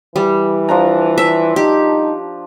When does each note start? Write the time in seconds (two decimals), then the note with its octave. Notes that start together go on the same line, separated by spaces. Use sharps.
0.16 E3 G3
0.69 F3 D4 A#5
1.18 E5
1.56 D#4 G4